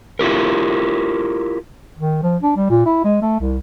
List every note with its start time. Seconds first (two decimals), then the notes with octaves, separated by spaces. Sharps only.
0.19 E4 F4 G4 A#4
1.98 D#3
2.23 F3
2.42 D4
2.56 G3
2.70 A#2
2.86 E4
3.04 G#3
3.22 A3
3.40 C2